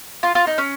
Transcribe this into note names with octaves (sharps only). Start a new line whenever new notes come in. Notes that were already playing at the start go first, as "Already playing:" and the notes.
F4
F4
D#4
C#4